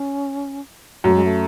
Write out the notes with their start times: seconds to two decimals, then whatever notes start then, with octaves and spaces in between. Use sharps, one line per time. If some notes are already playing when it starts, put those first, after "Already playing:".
Already playing: C#4
1.04 F#2 A3
1.15 G#3
1.25 A3